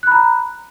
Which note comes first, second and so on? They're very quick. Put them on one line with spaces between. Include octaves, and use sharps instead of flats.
F#6 B5 A#5